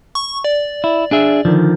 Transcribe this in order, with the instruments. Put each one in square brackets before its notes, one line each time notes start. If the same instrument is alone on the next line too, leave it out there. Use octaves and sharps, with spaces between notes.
[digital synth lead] C#6
D5
[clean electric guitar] E4
D4 G#4 E5
[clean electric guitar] D3 [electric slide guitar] D#3 F3